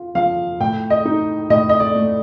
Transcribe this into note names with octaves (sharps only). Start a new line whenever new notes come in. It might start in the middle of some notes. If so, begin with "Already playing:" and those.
Already playing: F4
F3 F5
A2 G5
D#5
D#4
A2 D#5
D#5
D5
A3